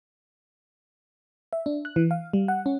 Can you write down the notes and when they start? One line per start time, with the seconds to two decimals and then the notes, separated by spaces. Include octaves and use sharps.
1.53 E5
1.66 D4
1.85 F#6
1.96 E3
2.11 F5
2.33 G3
2.48 F#5
2.66 C#4